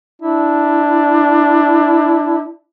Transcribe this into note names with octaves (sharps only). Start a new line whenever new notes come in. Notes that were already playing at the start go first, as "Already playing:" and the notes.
D4 E4